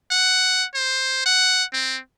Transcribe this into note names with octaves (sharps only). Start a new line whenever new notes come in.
F#5
C5
F#5
C4